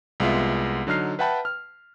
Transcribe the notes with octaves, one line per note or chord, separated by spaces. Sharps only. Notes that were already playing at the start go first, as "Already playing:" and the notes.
C2 G#3 B3 F4 E5
D3 F#3 D#4 F6 C7
B4 E5 F#5 G5 A5 B5
F6